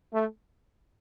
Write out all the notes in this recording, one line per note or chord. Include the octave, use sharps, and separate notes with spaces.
A3